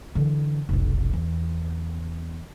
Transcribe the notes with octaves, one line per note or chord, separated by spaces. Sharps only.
D3 E3
F1 B1
E2